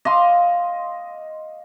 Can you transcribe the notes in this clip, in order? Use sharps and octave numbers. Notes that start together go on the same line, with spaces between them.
D#5 F5 C6 D6